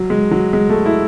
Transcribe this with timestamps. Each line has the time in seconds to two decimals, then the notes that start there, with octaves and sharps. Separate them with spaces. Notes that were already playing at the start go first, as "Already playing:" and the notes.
Already playing: F#3
0.10 G#3
0.31 F#3
0.53 G#3
0.69 A3
0.86 E4